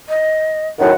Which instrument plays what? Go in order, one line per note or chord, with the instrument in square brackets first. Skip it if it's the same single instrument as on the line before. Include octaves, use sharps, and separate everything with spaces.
[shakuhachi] D#5
[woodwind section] F#2 A2 D#3 [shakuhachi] F#5